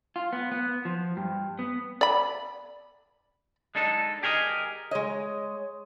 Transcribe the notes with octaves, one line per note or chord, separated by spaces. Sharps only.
F4
B3
B3
F3
G2
B3
D5 B5
G#3 D4 D#4 A4
G4 G#4 A#4 C5 D#5
G#3 C#5 D#5